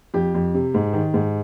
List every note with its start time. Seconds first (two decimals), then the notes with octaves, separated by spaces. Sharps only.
0.14 F2 G4
0.34 F2
0.54 C3
0.74 G#2
0.93 D#3
1.14 G#2